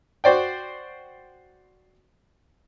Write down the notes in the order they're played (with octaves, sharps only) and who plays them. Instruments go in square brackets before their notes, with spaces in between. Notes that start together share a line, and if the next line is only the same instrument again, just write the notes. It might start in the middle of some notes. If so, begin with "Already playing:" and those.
[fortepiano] F#4 C5 D5 G5